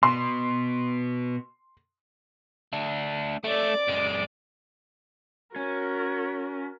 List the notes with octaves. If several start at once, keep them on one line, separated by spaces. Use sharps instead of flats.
B2 C6
A3 D4
A3 D5 D7
F#2 G#3
C#4 F#4 A#4